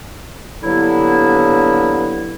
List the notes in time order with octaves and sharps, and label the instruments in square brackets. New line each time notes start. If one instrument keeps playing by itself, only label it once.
[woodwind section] G2 D3 F#3 A#3 B3 E4